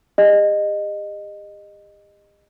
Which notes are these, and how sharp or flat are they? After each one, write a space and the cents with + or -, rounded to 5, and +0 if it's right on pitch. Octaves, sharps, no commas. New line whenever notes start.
G4 +45 D#5 -20